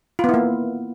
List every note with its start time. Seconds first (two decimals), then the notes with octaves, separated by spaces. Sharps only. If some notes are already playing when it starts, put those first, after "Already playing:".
0.19 F4
0.24 B3
0.29 E4
0.34 A#3